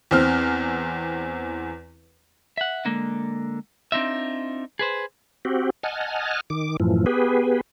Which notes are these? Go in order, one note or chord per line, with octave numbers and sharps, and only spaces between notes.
E2 C4 F6
E5 F#5
D3 G#3 A#3
C4 D4 D#4 F4 E5
G#4 B4 C5
C4 F#4 G4
D#5 F#5 G#5 A5 F6
D#3 D6
F#2 A2 E3 F3
B3 G4 G#4 B4